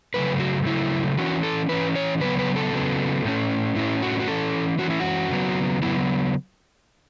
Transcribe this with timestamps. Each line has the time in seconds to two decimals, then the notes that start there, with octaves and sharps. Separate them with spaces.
0.14 C#3 F#3 A3 B4
0.40 F#4
0.66 C#3 F#3 A3 E4
1.17 E3 C#4 F#4
1.43 A4
1.69 E3 C#4 B4
1.96 C#5
2.20 C#3 F#3 B3 B4
2.39 B4
2.56 A4
2.73 C#3 F#3 B3
3.25 A2 A3 C#4
3.75 A2 A3 C#4 E4
4.02 F#4
4.20 F#4
4.27 E3 C#4 A4
4.79 E3 C#4 F#4
4.90 E4
5.00 F#4
5.30 C#3 F#3 B3
5.82 C#3 F#3 B3 E4